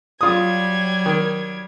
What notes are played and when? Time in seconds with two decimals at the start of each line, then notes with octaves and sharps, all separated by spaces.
0.21 F#3 G3 F4 D#6 G#6
1.06 D#3